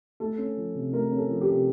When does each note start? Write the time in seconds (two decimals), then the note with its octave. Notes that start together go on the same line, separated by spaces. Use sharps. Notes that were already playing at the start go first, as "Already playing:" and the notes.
0.20 A3 A4
0.38 C#4
0.57 F3
0.75 C3
0.93 A3 A#4
1.11 C#4
1.18 A4
1.29 F3
1.41 G4
1.48 C3